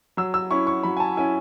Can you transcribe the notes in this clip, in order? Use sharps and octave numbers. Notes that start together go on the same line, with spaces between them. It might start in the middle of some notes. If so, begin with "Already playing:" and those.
F#3 E6
E6
C#4 E4 C#6
C#6
F#3 B5
G#5
A5
C#4 E4 G#5